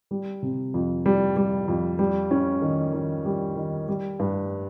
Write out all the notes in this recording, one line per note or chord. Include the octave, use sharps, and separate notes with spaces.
G3
C3
F2
G3
G3
F2
G3
C#4
D#3
D#3
G3
D#3
G3
G2